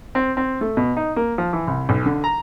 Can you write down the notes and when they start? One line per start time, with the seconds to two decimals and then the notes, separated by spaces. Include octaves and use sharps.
0.15 C4
0.37 C4
0.61 A3
0.77 B2
0.97 D#4
1.16 A#3
1.38 F3
1.53 E3
1.67 C2
1.89 B1
2.06 D3
2.24 A#5